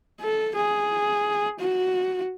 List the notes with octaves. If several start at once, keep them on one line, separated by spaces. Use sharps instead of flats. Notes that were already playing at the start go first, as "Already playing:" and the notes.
A4
G#4
F#4